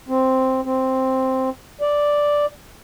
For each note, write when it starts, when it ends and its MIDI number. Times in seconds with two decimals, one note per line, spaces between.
0.09 0.61 60
0.65 1.50 60
1.81 2.46 74